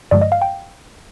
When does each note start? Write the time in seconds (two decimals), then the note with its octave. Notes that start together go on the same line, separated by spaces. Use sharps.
0.11 G2 D3 F3 G#3 D5
0.21 D#5
0.32 F5
0.42 G5